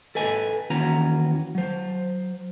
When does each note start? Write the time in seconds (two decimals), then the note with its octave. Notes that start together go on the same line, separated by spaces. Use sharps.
0.15 A4 B4 D#5 G#5
0.70 D#2 E3 C#4 F#4 B4 A#5
1.55 F#3 C5